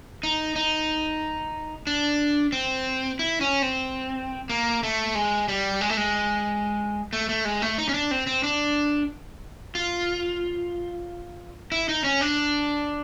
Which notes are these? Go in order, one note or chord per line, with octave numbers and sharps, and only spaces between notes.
D#4
D#4
D4
C4
E4
C#4
C4
A#3
A3
G#3
G3
G#3
A3
G#3
A3
A3
G#3
A3
D#4
C#4
D4
C4
C4
D4
F4
E4
D#4
C#4
D4